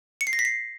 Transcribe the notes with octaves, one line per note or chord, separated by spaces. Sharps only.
C#7
C7
A#6
B6
C7